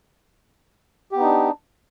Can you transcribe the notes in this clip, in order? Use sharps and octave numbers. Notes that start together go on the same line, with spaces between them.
B3 D4 D#4 G4